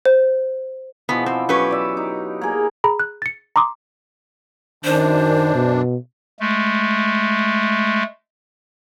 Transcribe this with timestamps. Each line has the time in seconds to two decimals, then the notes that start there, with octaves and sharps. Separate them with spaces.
0.05 C5
1.09 B2 E3 F3 B3
1.26 C4
1.49 F#3 C#4 G4 B4
1.71 D5 E5
1.97 D#4
2.41 A#3 G#4
2.84 G#4 A#5 B5
3.00 F#6
3.22 A6 C#7
3.56 A#5 C6 D6 D#6
4.85 F#2 D#3 D4 C5
5.54 B2
6.40 G#3 A3